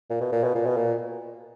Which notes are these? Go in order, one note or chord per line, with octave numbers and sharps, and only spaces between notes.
A#2
B2
A#2
B2
A#2
B2
A#2